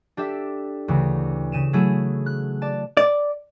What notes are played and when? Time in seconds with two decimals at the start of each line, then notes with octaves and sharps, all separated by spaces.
0.17 D4 G4 A4 E5
0.88 D2 C#3 E3
1.52 C#3 D#7 E7
1.73 F#3 A3 E4 G#4
2.26 F#6
2.62 D5 A5
2.97 D5